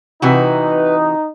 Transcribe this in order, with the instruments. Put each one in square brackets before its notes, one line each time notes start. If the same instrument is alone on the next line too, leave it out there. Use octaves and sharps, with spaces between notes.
[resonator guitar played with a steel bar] C3 E3 F#4 [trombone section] D#4 [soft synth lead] B4